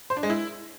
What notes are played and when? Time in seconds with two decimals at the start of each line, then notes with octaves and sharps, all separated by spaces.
0.10 C5
0.17 D4
0.23 G#3
0.30 E4